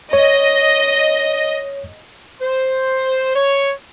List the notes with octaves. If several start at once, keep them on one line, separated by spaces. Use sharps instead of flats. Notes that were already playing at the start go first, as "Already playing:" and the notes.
C#5 D#5
C5
C#5